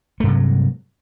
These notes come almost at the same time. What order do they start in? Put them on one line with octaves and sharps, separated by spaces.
A3 G2 C3 F#3